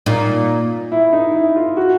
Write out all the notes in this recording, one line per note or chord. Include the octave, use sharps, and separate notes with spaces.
A#2 D#4
E4
D#4
E4
F4
F#4